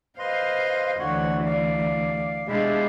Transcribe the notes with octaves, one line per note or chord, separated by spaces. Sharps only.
B4 C5 D#5 F5 C6
D2 D3 E3 F#4 C#5 F#5
D5 F5
B2 G#3 D4 E4 G4 F5